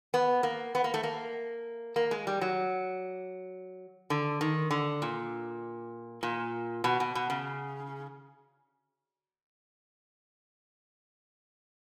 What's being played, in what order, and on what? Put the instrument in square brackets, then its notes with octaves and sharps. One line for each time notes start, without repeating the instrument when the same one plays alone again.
[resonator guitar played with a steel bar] B3
A#3
B3
A#3
A3
A#3
A#3
G#3
G3
F#3
D3
D#3
D3
A#2
A#2
B2
B2
B2
C#3